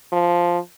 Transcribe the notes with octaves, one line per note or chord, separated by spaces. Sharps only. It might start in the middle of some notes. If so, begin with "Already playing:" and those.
F3